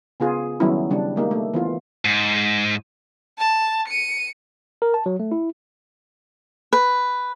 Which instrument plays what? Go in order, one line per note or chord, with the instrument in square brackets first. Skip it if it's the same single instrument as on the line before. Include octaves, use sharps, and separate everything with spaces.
[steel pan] C#3 B3 F4 G#4
D#3 F#3 G3 B3 C#4 E4
C#3 G3 D4
G#3 A#3 D#4 G4
A3
E3 B3 F4
[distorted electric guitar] G#2
[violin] A5
C#7 D#7
[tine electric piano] A#4
A5
F#3
A3
E4
[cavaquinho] B4